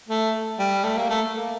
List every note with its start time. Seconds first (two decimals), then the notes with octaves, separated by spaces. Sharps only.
0.09 A3
0.59 G3
0.84 A3
0.98 A#3
1.10 A3
1.36 A#3